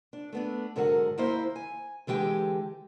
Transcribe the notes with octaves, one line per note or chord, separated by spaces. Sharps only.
D4
A3 B3 D4
G#2 D3 F#3 A#4 F#5
D#2 A#3 E4 C5
G#5
D3 E3 G#3 G4 G5